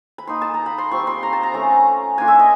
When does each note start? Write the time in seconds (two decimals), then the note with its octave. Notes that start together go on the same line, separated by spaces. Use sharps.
0.18 B5
0.27 A#3 D#4 C6
0.42 A5
0.54 A#5
0.66 B5
0.78 C6
0.91 G3 C4 F4 C#6
1.07 C6
1.23 A#5
1.33 A5
1.43 A#5
1.54 A3 C#4 F4
2.18 A#3 D4 F4 G#5
2.28 E5
2.39 D#5